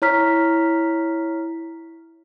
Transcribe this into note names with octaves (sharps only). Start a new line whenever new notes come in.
E4 C#5 A#5 F6 B6